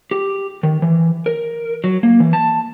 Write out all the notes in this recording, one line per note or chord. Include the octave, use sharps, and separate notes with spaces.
G4
D#3
E3
A#4
F#3
A#3
E3
A5